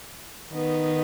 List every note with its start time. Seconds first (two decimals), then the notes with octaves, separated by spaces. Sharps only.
0.52 D#3 B3 D#4